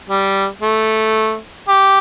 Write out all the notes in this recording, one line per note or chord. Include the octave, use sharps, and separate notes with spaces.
G3
A3
G4